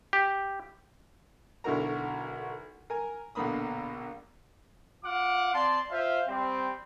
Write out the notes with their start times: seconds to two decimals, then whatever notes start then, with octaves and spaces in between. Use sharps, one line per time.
0.13 G4
1.64 B1 D3 E4 F#4 A#4 A#5
2.90 A#4 G#5
3.35 A#1 B2 D3 A#3 B5 D#6
5.04 F4 F5 F#5 D6
5.53 C4 D5 A5 C6
5.90 F4 C5 E5 F5
6.28 G3 C4